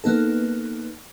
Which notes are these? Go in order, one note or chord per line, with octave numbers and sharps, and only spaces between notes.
A#3 B3 D#4 A4